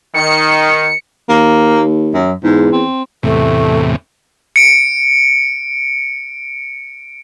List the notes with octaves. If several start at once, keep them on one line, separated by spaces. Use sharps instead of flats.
D#3 C#7
D#2 A#3
F#2
E2 G#2
C4
E2 A2 C3 A3
C#7 D7